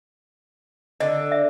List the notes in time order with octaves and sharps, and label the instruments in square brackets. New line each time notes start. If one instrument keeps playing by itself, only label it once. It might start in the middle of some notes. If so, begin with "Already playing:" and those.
[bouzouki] D3 [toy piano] D#5
[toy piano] E5